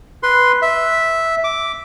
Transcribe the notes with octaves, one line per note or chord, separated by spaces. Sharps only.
B4 C6
E5
D6